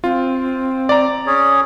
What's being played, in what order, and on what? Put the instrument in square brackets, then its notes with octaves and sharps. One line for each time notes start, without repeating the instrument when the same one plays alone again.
[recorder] C4 [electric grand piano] F4
[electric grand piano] D5 A#5
[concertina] C#4 G#4 C#5